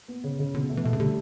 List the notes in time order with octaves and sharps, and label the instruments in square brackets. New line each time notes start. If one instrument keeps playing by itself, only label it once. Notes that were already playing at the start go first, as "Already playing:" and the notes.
[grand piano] B3
C#3
C#3
[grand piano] B2 [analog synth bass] D3
[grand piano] A3
[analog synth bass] E3
[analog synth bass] B2 [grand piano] A3
[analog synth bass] C#3
[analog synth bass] D3 [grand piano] G3